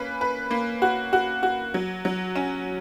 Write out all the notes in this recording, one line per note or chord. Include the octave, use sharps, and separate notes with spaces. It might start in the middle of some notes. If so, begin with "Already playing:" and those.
Already playing: A#3 C#4 B4
B4
A#3
F#4
F#4
F#4
F#3
F#3
C#4